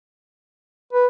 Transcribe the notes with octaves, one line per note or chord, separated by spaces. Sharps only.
B4